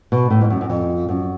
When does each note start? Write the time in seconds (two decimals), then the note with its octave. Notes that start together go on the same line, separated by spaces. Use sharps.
0.12 B2
0.31 A2
0.41 G#2
0.50 F#2
0.61 F#2
0.70 F2
1.09 F#2